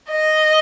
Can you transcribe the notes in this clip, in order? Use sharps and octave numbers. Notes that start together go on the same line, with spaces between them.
D#5